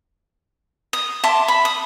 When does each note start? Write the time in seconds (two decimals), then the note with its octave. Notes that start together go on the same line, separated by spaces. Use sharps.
0.93 D#6
1.24 E5 A5 C6 D6
1.48 B5
1.65 D#6